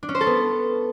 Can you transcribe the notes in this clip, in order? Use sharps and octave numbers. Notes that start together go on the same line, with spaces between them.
D4
C#4
C5
A4
B3